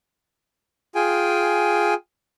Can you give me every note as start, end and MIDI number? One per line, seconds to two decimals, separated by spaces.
0.95 1.94 65
0.95 1.94 68
0.95 1.94 79
0.95 1.94 80